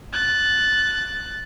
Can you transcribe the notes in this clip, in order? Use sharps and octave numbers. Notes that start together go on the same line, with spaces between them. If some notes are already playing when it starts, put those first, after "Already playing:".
F#6 A6